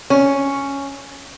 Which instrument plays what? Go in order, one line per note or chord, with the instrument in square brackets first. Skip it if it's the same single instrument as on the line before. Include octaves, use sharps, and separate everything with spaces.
[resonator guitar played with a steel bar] C#4